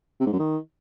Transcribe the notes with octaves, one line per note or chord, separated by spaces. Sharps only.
C3
G#2
F#2
D#3